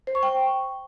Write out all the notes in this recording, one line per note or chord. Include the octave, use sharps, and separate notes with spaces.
C5
C#6
G5